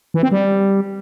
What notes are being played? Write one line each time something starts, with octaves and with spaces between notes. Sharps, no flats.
E3
C4
G3